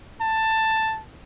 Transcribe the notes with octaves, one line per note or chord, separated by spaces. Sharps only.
A5